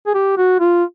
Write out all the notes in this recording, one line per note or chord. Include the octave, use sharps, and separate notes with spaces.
G#4
G4
F#4
F4